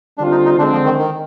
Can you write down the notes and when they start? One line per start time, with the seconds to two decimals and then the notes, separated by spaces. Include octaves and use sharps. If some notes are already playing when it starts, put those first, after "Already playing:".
0.18 D3 G3 C4 D4 F4
0.31 D#4
0.45 D#4
0.58 D3 G#3 C4 D4
0.72 F3
0.85 D#3
0.98 D#3